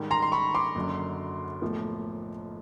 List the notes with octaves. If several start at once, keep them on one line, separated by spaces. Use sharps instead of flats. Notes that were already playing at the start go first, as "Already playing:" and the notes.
Already playing: G#2 D#3 G3
A#5 C6
C6
B5 C#6
C6 D6
F#1 F#2 D3 F#3
B1 A2 F3 A#3